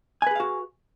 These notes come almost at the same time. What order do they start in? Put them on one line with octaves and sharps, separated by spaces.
G#5 B4 G#4 F5 F#4